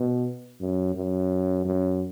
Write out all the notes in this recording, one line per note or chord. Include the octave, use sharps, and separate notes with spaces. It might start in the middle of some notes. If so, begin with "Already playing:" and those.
Already playing: B2
F#2
F#2
F#2